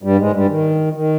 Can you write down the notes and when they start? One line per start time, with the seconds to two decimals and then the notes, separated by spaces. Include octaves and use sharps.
0.03 G2 G3
0.17 G#2 G#3
0.33 G2 G3
0.49 D#3
0.93 D#3